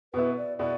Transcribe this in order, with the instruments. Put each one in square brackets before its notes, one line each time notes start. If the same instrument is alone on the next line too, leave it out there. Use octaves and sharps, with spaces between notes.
[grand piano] B2 B3 E4 [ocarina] B4
[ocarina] D5
[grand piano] B2 B3 E4 [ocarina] D5